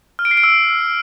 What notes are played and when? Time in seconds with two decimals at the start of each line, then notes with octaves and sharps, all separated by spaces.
0.19 F6
0.25 D7
0.31 C7
0.37 D7
0.43 E6